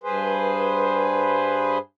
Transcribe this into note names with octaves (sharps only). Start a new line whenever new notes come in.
G2 G#4 B4 C5